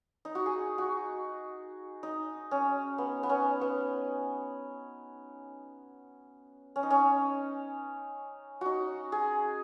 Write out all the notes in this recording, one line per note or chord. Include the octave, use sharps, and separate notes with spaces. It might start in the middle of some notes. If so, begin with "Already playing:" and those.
D#4
F#4
G#4
F#4
D#4
C#4
B3
B3
C#4
B3
C#4
D#4
C#4
D#4 F#4
G#4